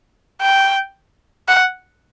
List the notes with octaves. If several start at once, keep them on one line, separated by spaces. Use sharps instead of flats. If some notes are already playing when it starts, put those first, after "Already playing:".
G5
F#5